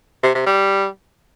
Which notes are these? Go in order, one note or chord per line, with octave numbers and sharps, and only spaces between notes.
C3
C3
G3